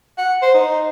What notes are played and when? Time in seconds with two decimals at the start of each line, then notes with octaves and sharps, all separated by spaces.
0.18 F#5
0.42 C5
0.54 D#4